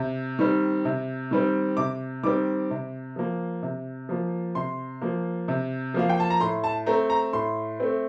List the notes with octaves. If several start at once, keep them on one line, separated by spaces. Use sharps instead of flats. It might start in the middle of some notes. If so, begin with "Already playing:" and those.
Already playing: C3
D#3 G3 C4
C3
D#3 G3 C4
C3 D6
D#3 G3 C4 D6
C3
F3 A#3
C3
F3 A#3
C3 C6
F3 A#3
C3
F3 A#3 F5
G5
A5
A#5
A2 C6
A5
A3 C4 A#5
A#5
A2 C6
A3 C4